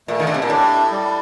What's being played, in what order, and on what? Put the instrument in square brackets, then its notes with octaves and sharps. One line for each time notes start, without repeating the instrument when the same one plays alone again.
[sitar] A#2 [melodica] A3
[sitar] D#3
D3
C3
A#2
[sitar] A2 [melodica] D4 G4
[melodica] G3